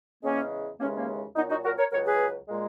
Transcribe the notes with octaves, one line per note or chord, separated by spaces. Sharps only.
E2 C#3 G#3 A#3 C#4
D#2 C#3 E3 G#3 A#3 C#4
A#3 C#4
A#2 F#3 B3 D#4
D#4 F#4
F#4 A#4
A#4 C#5
C#2 C#3 F#3 A#4 C#5
G#4 B4
A#2 G#3